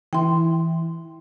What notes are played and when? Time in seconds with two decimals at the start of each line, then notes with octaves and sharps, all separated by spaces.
0.13 E3 E4 G5 C6